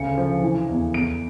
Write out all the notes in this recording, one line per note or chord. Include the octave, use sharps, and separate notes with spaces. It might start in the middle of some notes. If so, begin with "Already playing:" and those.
Already playing: D2 C#3 C#7
F3
E3
E2
E2 D7